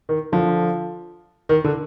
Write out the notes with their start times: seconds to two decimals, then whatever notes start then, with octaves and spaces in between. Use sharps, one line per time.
0.09 D#3
0.32 D3 F3
1.49 D#3
1.64 D3